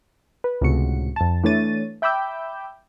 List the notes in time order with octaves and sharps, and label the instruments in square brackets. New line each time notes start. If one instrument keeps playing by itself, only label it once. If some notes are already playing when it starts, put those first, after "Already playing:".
[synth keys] B4
C#2 A2 C3 F#4 C#7
F2 A5
E3 A3 D4 C#5 A6 D#7
E5 G5 B5 D6 E6 G6